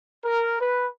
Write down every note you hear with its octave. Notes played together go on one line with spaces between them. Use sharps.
A#4
B4